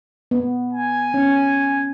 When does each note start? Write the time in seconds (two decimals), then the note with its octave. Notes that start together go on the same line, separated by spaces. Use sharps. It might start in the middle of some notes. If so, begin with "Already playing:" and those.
0.31 B3
0.73 G#5
1.14 C#4